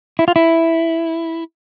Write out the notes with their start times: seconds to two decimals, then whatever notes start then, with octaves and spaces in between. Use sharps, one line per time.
0.19 E4
0.28 F4
0.36 E4